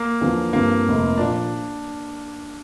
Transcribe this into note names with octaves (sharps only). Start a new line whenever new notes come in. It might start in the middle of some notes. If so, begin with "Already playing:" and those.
Already playing: A#3
E2 D3 F3
G2 D3 F3 A#3 C4
F1 F2 C3
A#2 F3 D4